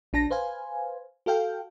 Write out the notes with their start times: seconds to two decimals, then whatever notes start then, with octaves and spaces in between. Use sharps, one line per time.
0.13 A#1 D4 A5 A#6
0.31 B4 C5 F5 G#5
1.26 F#4 A4 F5 G5